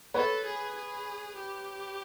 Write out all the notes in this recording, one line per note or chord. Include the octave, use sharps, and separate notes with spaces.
A4 B4 C#5
G#4
G#4
G4